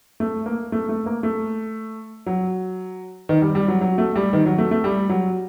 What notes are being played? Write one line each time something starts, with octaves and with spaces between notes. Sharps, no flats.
A3
A#3
A3
A3
A#3
A3
F#3
D#3
G3
G3
F#3
F#3
A3
G3
D#3
F#3
A3
A3
G3
F#3